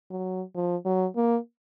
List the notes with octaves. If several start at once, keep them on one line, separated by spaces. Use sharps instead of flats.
F#3
F3
F#3
A#3